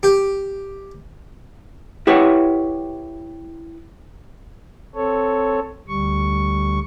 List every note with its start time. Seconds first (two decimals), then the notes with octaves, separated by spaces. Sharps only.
0.03 G4
2.07 E4 G4 B4 C#5 E5 F#5
4.95 C4 A4 C#5
5.88 D2 G3 C#6